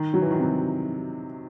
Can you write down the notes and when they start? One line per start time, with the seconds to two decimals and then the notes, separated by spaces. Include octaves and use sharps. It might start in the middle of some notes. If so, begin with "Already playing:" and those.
Already playing: D#3
0.14 F#3
0.22 E3
0.31 D#3
0.39 C3